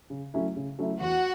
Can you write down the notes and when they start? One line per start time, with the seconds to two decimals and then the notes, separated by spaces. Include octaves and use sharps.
0.10 C#3
0.34 F#3 A3 C#4 E4
0.56 C#3
0.79 F#3 A3 C#4 E4
1.00 E2 F#4 F#5